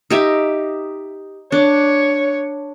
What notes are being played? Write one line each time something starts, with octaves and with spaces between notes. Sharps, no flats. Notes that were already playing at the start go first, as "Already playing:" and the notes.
D#4 G4 E5
D4 C#5